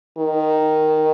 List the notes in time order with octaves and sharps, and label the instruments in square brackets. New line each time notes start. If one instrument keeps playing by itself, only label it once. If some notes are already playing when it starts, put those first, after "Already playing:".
[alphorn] D#3